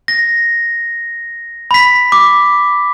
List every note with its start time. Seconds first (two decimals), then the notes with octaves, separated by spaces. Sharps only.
0.08 A#6
1.71 B5 B6
2.12 D6